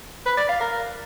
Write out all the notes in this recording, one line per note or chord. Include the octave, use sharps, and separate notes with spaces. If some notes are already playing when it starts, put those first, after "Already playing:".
B4
D5
F5
A#4